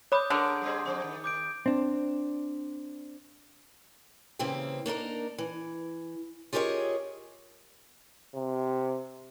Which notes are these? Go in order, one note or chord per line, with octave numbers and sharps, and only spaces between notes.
C#5 B5 D6 D#6 G6
D3 C#4 G#4 A#4
G3 C4 G#4
F2 E3 C4
D#3
D6 G6 D7
C4 D4
C#3 E3 A#3 C4 G4
A#3 D4 D#4 A#4
E3
F4 G4 G#4 A#4 C#5 D#5
C3